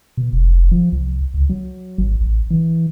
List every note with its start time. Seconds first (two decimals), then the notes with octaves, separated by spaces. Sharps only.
0.17 B2
0.33 F1
0.72 F3
0.92 C2
1.34 C#2
1.49 F#3
1.98 G#1
2.21 A1
2.50 E3